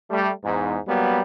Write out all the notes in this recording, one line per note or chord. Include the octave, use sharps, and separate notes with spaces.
G3 A3
E2 G#2
F#3 G3 A#3 B3